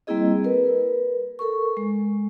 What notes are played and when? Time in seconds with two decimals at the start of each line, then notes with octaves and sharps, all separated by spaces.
0.07 G3 A#3 C4 E4 G#4 D#5
0.44 A#4 B4
1.39 A4 A#4 C#6
1.77 G#3